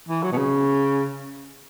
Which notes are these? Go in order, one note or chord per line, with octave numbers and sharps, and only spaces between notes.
E3
F#3
B2
C#3